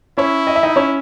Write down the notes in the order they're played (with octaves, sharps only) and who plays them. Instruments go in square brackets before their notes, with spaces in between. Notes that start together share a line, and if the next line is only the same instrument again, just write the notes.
[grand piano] C#4 C#5 [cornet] E4
[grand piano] D#5
E5
D#4 D#5
C#4 C#5